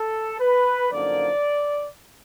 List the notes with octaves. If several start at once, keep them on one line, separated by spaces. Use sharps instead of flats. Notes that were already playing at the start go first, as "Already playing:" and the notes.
Already playing: A4
B4
F#2 D3 F3 A#3 D#4 D5